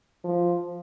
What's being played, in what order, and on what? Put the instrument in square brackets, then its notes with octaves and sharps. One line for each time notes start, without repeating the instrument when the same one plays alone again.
[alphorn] F3